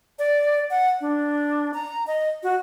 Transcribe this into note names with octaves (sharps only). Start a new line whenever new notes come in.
D5
F#5
D4
A#5
D#5
F#4